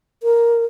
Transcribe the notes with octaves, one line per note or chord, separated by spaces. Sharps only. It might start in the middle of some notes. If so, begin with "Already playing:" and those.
A#4